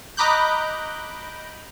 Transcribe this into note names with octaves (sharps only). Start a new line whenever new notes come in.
D#5 A#5 B5 D6 F#6 G6